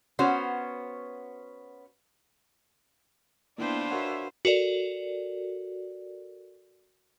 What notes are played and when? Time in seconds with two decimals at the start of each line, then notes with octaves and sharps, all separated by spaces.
0.19 B3 C#4 F#4 C5
3.58 A#3 B3 D4 E4 F4 B4 C5 G5
3.91 F#4 A#4 C#5 E5 F#5
4.45 F#4 A4 A#4 D5